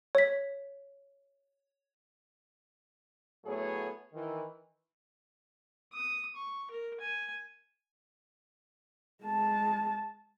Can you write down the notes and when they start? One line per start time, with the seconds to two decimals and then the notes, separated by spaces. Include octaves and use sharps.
0.15 C#5 B6
3.45 A2 F#3 A3 B3 G#4 C#5
4.13 D#3 E3
5.93 D#6
6.36 C#6
6.71 A#4
7.01 G#5
9.24 G#3 A5